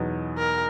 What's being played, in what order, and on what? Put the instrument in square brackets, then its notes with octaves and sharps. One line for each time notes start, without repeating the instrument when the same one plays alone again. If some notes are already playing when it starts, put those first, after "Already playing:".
Already playing: [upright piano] E2 B2 F#3 B3 D#4
[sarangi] A#4